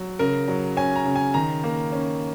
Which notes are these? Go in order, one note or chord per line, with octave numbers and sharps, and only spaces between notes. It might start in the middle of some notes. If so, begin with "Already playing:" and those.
Already playing: F#3
C#3 A#4
F#3
C#4 G#5
A#5
C#3
G#5
D#3 A#5
A#3
C#4